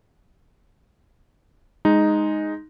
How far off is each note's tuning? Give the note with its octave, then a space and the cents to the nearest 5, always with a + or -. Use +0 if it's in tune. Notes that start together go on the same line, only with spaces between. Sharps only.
G#3 +0 D#4 +0